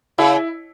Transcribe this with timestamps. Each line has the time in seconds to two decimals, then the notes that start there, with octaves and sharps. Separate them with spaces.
0.18 C#3 E4